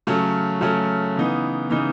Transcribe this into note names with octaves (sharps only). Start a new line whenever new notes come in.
C#3 F#3 A3 C#4
C#3 F#3 A3 C#4
C#3 E3 B3 D#4
C#3 E3 B3 D#4